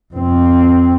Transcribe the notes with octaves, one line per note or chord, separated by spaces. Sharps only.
F2 C4